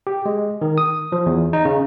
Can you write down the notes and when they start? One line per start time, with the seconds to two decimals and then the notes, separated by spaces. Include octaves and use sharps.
0.07 G4
0.26 G#3
0.61 D#3
0.78 D#6
1.12 F3
1.26 E2
1.53 D#4
1.65 C#3